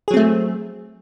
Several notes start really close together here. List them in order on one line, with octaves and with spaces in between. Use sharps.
G#4 F#3 C4 A3